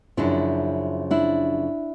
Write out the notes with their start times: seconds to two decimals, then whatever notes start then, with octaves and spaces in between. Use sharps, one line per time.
0.17 F#2 C#3 F3 D4 E4
1.11 D4 E4